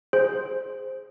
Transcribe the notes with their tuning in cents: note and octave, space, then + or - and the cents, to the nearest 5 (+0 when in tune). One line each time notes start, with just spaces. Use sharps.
G#4 +0 C5 +0